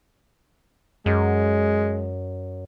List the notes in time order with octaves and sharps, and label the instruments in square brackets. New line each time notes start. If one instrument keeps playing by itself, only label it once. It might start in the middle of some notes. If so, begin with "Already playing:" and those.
[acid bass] F#2 [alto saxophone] G#3